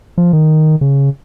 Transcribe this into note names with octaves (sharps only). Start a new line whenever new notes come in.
F3
D#3
C#3